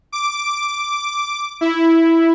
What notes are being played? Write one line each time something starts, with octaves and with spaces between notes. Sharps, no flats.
D6
E4